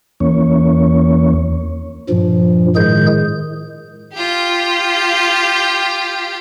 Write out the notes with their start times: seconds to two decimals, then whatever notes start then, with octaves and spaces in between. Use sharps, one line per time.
0.20 E2 E3 A#3 C#4 C#5
2.09 G2 A#2 F3
2.76 A2 D#3 G#3 G#4 G6
4.14 F4 G4